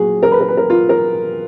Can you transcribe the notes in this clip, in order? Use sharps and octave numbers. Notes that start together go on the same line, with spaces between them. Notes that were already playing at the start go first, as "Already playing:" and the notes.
Already playing: A#2 F#3 F#4 G#4
A#4
B4
A#4
B4
A#4
F4
A#4